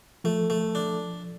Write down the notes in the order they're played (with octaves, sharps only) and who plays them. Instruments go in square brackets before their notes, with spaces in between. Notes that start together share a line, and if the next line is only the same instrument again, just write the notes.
[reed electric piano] F3 [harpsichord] A3
[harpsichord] A3
D4